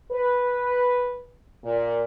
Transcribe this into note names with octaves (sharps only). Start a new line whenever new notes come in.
B4
A#2